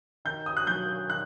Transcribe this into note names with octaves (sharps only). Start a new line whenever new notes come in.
D#3 G6
D#6
F#6
F#3 G6
D#3 F#6